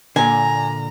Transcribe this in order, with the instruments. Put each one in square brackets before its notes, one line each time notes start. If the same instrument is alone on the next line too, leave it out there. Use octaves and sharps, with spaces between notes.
[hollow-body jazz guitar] A#2 D3 [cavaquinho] G#5 [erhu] A#5